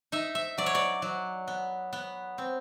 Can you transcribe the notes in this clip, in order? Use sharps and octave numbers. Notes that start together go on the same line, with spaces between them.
D#4 E5
E5
F#3 D5
C#5
D5
F#3
B3
B3
C4